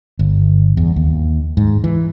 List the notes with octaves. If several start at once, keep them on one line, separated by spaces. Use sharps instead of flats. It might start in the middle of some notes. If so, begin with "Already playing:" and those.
G1
E2
D#2
G#2
E3